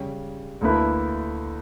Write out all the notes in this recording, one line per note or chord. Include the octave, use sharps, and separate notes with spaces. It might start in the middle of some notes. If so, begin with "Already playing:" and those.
Already playing: C#3 G3 C#4
D2 D3 A#3 E4 B4